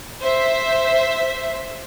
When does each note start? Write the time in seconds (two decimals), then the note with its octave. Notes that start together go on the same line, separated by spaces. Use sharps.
0.21 C5 E5